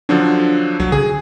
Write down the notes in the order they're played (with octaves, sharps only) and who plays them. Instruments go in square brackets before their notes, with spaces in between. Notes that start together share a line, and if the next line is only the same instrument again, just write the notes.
[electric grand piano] D3 F3 F#3 [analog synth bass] D4
[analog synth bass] C2 [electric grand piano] F#3
[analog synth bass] D3 [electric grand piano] G#4